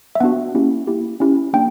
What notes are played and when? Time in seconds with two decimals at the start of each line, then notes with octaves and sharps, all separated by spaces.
0.15 E5
0.20 B3 D4 F#4 F#5
0.55 A#3 C#4 E4 G4
0.87 A#3 E4 G4
1.20 C#4 E4 G4
1.53 A#3 D4 G5